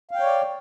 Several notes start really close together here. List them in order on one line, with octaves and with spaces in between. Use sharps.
F5 G5 C#5 D5